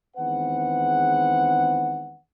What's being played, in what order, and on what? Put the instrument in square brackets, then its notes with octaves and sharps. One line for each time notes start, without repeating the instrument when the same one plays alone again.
[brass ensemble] E2 D#3 G#3 C4 B4 F#5